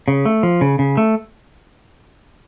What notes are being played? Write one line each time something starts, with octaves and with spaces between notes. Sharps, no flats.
C#3
A3
F3
C#3
C#3
A3